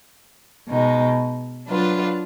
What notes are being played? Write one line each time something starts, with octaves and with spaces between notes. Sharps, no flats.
B2 G#3 D#4
F#3 D4 F4 B4